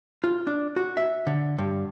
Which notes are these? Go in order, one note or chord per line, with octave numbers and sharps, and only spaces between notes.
F4
D4
F#4
E5
D3
G2